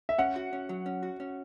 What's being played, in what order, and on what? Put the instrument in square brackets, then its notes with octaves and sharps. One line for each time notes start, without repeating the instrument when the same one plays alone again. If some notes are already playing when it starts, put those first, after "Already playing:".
[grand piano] E5
[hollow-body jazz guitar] C#4 [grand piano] F#5
[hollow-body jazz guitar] F#4
C#4
F#3
C#4
F#4
C#4